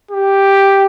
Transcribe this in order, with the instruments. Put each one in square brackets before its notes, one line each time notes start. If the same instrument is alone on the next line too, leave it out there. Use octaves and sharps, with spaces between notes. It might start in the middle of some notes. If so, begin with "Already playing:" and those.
[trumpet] G4